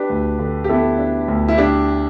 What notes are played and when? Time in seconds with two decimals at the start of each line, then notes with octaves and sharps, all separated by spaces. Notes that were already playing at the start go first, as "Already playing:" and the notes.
Already playing: D4 G4 B4
0.09 D2
0.39 D3
0.64 G4
0.69 B3 E4 A4
0.99 D4
1.28 D2
1.48 E4
1.58 D4 G4